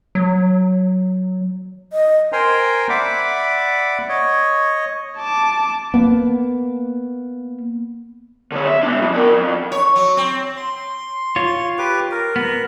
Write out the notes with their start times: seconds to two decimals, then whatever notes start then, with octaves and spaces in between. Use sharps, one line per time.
0.15 F#3
1.93 D#5
2.32 A#4 C5 G5 G#5 A#5 C6
2.89 D5 E5 F#5 B5 D6
4.09 C#5 D#5
5.18 A5 D6
5.94 A#3 B3
8.52 D3 C#5
8.67 E5
8.83 B3 D4
8.98 C2 F2
9.14 D4 A#4
9.29 F2
9.72 C#5
9.96 F#3
10.17 C4
10.57 C6
11.36 F4 C#5
11.78 G4 B4 D6
12.11 A#4
12.36 B3